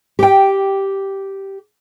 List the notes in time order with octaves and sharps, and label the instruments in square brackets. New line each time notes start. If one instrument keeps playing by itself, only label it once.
[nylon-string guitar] G4 G5